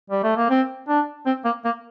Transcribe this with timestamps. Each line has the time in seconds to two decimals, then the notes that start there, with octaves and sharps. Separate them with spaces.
0.10 G3
0.23 A3
0.37 A#3
0.50 C4
0.88 D4
1.26 C4
1.45 A#3
1.64 A#3